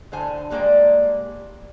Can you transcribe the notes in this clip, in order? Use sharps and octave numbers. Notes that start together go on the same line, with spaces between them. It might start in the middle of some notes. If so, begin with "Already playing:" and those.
A2 D3 C5 G#5
G3 G#3 A#3 C5 D5